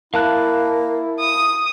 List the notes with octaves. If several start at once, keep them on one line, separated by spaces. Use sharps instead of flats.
A#3 E4 F5 A5 F#6
D#6